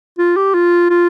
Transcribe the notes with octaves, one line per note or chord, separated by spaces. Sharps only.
F4
G4
F4
F4